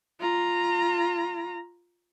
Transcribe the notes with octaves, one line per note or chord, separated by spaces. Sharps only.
F4 A#5